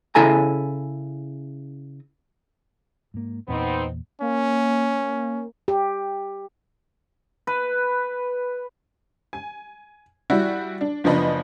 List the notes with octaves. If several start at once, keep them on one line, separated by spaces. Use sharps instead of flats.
C#3 E4 A4 G#5 A#5
G#2 A#3
E2 A#2 B3 C4 D#4
A#3 C#4
G4
B4
G#5
G3 E4 F#4
D4
F#1 F3 B3 D4 D#5 B5